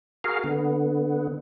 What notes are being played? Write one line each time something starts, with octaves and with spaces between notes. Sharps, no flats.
F#4 G#4 A#4 F5
D3 B3